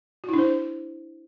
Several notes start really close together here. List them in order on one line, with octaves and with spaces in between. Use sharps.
F#4 E4 D4 C5